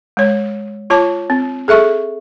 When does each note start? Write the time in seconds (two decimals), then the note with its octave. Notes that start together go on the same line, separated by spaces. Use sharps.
0.17 G#3 C#5
0.90 F4 C#5 A5 D6
1.30 C4
1.68 G#4 A4 E5 C#6